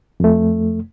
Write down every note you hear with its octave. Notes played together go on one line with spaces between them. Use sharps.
F2 A3